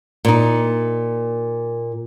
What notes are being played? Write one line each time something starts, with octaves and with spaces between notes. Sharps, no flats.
A#2 D#4